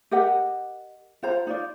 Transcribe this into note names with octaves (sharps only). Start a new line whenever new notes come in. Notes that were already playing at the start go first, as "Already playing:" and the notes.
G4 A#4 D#5 F#5
F4 C5 A#5
D#4 F4 D5